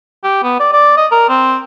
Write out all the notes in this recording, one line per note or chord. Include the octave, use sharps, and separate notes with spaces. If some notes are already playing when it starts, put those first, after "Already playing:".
G4
B3
D5
D5
D#5
A#4
C4